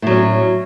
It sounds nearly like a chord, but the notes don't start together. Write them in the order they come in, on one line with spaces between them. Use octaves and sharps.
A2 F#3 C#4